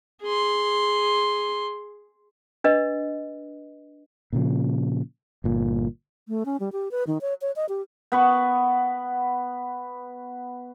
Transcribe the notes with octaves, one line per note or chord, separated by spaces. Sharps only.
G#4 C6
D4 B4 D#5
A#2 C#3 F3
G1 A#2
A3
C#4
G3
G4
B4
D#3
C#5
C#5
D#5
G4
B3 B4 C#6